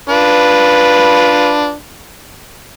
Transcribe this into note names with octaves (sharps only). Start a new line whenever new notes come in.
D4 F4 B4